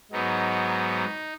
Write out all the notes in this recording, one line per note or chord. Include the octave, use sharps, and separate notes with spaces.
G#2 F#3 B3 D#4